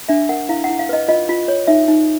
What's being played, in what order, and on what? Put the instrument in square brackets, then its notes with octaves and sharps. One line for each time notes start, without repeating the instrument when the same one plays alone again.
[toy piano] D4 E5
A#4 F#5
E4 F5
F#5
E4
F5
B4 D#5
F4 D#5
F4
C#5
D#4 E5
D#4